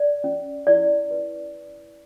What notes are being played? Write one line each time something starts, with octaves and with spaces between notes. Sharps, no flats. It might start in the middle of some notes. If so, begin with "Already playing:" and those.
Already playing: D5
C#4
E4 D5
B4